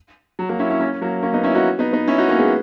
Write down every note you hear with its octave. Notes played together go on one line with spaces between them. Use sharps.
F#3
F#3 A#3
C#4 E4
C#4 E4
A#3 C#4
F#3 A#3
A#3 C#4
B3 D#4
C#4 E4
D#4 F#4
B3 D#4
B3 D#4
C#4 E4
D#4 F#4
A#3 C#4
G#3 B3